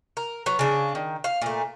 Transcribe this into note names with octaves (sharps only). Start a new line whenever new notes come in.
A#4
F#3 B3
C#3 D4
D#3
F5
A#2 A3